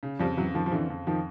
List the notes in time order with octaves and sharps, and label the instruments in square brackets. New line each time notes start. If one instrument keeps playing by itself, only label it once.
[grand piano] C#3
[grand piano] F2 [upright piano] F3 G3
[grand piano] C#3 [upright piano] E3 F#3
[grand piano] F2 [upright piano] D#3 F3
[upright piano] F3
[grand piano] F2 [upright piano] D3 E3
[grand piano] F2
[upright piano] D#3 F3